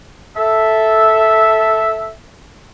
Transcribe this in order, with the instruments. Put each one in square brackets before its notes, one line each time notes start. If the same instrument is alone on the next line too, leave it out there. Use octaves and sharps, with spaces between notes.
[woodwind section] A4 E5